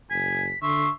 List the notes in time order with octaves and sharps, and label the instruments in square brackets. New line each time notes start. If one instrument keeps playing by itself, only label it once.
[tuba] F#1 [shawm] G#5 [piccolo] B6
[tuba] D3 [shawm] E5 [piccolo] C6 [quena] C#6